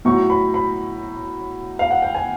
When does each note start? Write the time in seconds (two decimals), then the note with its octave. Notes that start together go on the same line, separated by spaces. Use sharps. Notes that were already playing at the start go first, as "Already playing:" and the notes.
0.05 A2 F#3 C#6
0.30 B5
0.54 B5
1.79 F5
1.91 F#5
2.02 G5
2.15 G#5